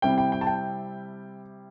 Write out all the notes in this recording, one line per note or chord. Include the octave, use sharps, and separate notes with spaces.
C3 G3 C4 E4 G5
G5
G5
A5
G5